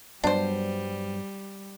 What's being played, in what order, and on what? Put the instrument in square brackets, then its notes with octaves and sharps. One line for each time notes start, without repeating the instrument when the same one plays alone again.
[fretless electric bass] G2 F#3 B3 [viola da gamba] G3 [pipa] D4 C5